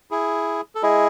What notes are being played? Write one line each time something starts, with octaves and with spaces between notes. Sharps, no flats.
E4 G#4
A4
G#3 E4 G#4